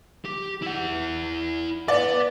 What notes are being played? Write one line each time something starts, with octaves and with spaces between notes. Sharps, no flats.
G4
E4 F#5
B4 D5 F#5